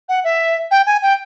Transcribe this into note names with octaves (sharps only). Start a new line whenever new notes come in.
F#5
E5
G5
G#5
G5